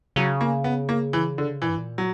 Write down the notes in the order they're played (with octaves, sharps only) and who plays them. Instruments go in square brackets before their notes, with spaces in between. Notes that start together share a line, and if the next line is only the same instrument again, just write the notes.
[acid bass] C#3 [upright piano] F#3
[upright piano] A#3
B3
A#3
E3
D3
[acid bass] A#2 [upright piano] E3
[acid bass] G2
A#2
[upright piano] F#3